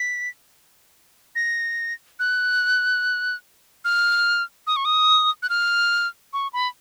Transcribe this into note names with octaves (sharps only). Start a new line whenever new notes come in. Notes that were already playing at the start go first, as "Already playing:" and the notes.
Already playing: B6
A#6
F#6
F6
D#6
C#6
D#6
F#6
F6
C#6
B5